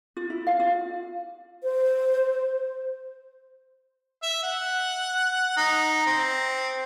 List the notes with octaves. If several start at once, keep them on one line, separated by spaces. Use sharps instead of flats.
F4
E4
F5
F4
C5
E5
F#5
D#4
C4